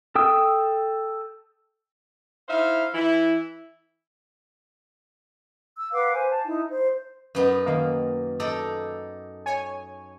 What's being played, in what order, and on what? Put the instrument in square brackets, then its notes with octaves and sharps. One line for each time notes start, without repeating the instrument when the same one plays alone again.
[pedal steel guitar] A4 G5 D#6 E6
[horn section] D#4 E4 C5 E5 F5
E3 E4
[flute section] E6
B4 F5 F#5 D6
C5 G#5
A5
D#4 E4
C5
[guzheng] F#2 B3 D#4
[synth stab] D#3 A#3
[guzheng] D#4 A4 D5
[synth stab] C#5 G#5